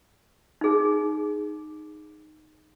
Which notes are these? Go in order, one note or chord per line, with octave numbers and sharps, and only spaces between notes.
D#4 G#4